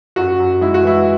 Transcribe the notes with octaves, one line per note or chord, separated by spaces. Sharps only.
F#2 F#4
F#2
G#3 E4
F#4
E3 E4